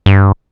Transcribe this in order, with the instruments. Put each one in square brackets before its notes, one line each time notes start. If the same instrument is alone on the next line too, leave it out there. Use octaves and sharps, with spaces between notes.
[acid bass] G2